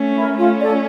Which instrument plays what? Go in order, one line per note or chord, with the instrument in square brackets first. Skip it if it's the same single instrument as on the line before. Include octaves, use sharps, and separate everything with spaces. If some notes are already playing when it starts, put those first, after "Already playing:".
Already playing: [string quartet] A3 C#4
[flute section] E4 A#4
[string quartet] A3 C#4 [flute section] F4
[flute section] A4 D5